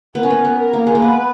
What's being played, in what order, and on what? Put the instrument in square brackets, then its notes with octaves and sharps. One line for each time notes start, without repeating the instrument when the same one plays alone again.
[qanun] B3 [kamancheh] A#4
[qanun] C#4
B3
B3
[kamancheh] A#4
[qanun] A#3
G#3
A#3
[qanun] B3 [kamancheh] B4